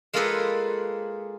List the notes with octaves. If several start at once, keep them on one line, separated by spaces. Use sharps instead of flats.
G#3 A#3 F4 G#4 A4 B4